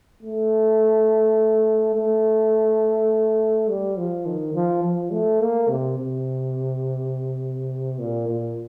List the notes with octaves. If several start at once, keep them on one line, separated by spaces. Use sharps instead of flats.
A3
A3
G3
F3
D#3
F3
F3
A3
A#3
C3
C3
A#2
A#2